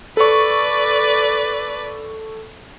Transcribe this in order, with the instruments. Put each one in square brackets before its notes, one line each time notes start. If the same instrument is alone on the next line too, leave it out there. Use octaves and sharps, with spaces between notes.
[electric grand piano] A4 C#6 [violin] B4 D5